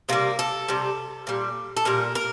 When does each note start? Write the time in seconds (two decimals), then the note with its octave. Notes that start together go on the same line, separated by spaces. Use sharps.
0.09 C3 G3 A#3
0.39 A4
0.68 C3 G3
1.27 A#2 G3
1.77 A4
1.85 A#2 G3 A#4
2.15 A#4